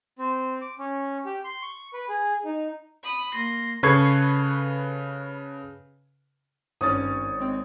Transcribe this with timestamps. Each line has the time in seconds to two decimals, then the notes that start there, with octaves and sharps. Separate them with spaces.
0.19 C4
0.62 D6
0.79 C#4
1.25 G4
1.44 C6
1.62 C#6
1.94 B4
2.09 G#4
2.45 D#4
3.03 B5 D#6
3.34 A#3 C6 A#6
3.83 C#3 A4 B4 C#6 G#6 C7
6.81 G#1 G2 C#4 C#5 D#6 F6 A6
7.40 G#3 C4